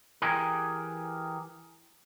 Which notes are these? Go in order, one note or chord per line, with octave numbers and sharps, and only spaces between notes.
E3 G4 G#4 A#4